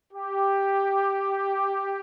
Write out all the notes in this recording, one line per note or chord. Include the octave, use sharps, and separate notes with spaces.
G4